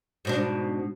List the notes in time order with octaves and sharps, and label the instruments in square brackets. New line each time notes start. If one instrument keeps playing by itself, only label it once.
[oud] G#2 B2 D4